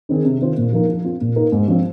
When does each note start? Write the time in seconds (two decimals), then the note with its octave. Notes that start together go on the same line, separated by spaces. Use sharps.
0.09 D#3 C4 G#4
0.25 C3
0.41 D#3 C4 F4 C5
0.57 A#2
0.73 F3 A#3 D#4 A#4
0.88 F3
1.04 C4 F4
1.21 A#2
1.36 A#3 D#4 A#4
1.52 G#2
1.68 F3 C4